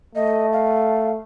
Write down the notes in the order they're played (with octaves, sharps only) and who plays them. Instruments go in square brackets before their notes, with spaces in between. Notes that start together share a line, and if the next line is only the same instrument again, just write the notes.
[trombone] A3 [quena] D#5
[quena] F5